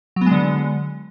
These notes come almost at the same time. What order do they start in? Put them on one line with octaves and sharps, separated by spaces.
F#3 B3 G#3 D3